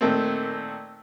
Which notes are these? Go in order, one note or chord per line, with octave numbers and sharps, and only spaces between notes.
A#2 D#3 A3 C4